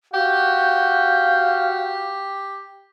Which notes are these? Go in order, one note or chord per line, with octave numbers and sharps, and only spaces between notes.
F#4 G4 F5 G6